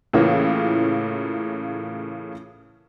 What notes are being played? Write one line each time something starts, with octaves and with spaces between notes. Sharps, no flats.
A2 C#3 E3 A#3 C#4 F4